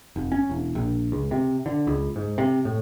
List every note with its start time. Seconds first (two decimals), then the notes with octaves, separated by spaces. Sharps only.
0.16 F1
0.32 C#4
0.50 E1
0.75 A#1
1.12 C#2
1.31 C3
1.66 D3
1.87 C#2
2.16 G#2
2.38 C3
2.65 A2